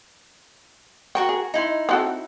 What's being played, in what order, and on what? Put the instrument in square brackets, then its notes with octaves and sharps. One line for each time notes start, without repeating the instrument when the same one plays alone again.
[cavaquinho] F#4 A#4 C#6 [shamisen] G5
[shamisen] G#4
[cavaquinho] D#4 E4 C6
[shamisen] C4 F#4 A4